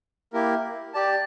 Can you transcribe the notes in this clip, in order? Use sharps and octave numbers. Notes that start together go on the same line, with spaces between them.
A#3 E4 G4 A#4
G4 D5 A5